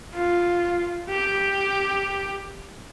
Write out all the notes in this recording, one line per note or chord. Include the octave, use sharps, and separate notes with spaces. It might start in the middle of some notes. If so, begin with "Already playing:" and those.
F4
G4